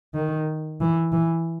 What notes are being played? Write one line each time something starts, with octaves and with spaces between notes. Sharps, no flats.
D#3
E3
E3